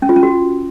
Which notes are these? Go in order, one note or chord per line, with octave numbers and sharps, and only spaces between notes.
C#4
F4
C#4
F#4